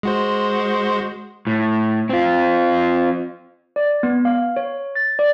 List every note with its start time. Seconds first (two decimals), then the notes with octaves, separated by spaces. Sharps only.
0.03 G#3 F#4 C5
1.47 A2
2.09 C4 F4
3.76 D5
4.03 B3
4.25 F5
4.56 C#5
4.95 A6
5.19 D5